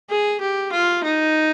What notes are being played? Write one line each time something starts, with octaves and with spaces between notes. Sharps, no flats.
G#4
G4
F4
D#4